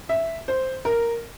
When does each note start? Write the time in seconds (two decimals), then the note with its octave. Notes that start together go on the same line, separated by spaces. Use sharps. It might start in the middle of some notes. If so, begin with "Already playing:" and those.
0.09 E5
0.48 C5
0.85 A#4